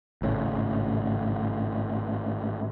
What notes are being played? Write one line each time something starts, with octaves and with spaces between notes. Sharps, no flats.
G#1 A2 C#3